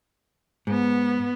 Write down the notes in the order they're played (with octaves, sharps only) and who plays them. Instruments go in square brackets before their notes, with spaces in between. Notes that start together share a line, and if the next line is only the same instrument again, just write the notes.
[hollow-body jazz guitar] G#2 [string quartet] B3